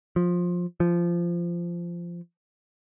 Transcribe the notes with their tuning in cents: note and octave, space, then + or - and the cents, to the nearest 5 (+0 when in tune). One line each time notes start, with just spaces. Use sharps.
F3 +15
F3 -15